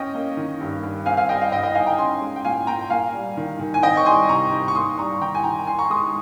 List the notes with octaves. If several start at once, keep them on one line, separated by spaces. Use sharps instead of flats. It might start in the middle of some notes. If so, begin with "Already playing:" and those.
Already playing: C#4 D#5 G5
A#3
D#3
G2
G2
C4 F5 G#5
F5 G#5
G3 D#5 G5
F5
G2 D#5 G5
D#5 G5
D#4 F5 G#5
G5 A#5
C#4 G#5 C6
G#3
G5
A#2 F5 G#5
A#2 G5 A#5
A#3 F5 G#5
G3
D#3
D#3
G#5
C4 D#5 G5
C#6
G3 G#5 C6
C3 A#5 C#6
D#4
C#6
A#3 C6 D#6
G3 A#5 C#6
D#3 G5 A#5
G#5
D#4 G5 A#5
D#4 G#5 C6
A#5 C#6
G#3 C6 D#6